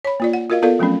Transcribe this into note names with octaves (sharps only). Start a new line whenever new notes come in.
C#5 B5
A#3 F4 D5
F#5
F4 F#4 A#4 D#5 F5
B3 F4 A4 A#4 D5 F5
F3 F#3 A3 C4 C#4